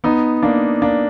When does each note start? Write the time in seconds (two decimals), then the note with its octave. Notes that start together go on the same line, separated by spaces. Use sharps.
0.04 B3 D#4
0.43 A#3 D4
0.82 A#3 D4